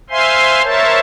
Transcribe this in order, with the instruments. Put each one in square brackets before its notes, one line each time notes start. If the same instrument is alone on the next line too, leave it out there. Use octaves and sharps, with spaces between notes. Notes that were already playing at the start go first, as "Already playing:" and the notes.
[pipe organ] C5 E5 F5 G#5 C6
A#4 C5 C#5 E5 A5